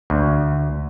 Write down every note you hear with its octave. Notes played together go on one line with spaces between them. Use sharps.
D2